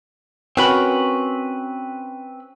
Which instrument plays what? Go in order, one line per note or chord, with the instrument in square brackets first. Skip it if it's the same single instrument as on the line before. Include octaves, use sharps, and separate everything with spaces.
[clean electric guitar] C4 B4 B5 [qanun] C#4 F#4 A#4